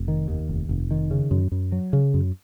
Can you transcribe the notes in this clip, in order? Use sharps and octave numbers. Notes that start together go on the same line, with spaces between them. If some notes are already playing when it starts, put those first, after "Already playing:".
Already playing: F1
D#3
D#2
F1
F1
D#3
C#3
F#2
F#2
F#3
C#3
F#2